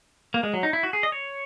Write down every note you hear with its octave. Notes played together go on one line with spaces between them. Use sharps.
A#3
G#3
F#3
D#4
E4
F#4
G#4
D#5
C#5